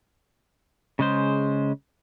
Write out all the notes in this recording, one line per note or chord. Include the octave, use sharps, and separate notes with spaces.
C#3 G#3 C5